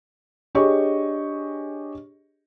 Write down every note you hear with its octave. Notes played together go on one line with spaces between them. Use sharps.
D4 G4 G#4 C#5 D#5 C#6